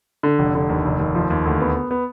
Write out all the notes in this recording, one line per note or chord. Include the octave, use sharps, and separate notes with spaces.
D3
F1
D3
D#2
F1
D#2
F3
D#2
D2
B3
B3
B3